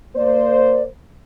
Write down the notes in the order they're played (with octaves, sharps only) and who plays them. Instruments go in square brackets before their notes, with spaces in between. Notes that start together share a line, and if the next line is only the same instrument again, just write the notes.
[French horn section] A#3 C5 [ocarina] D5